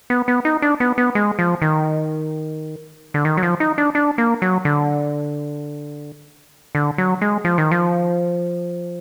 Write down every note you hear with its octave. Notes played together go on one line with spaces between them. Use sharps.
B3
B3
D#4
D4
B3
B3
G#3
F3
D#3
D3
D#3
F#3
F3
D#4
D4
D4
A#3
F#3
D3
D3
F#3
G#3
F3
D#3
F3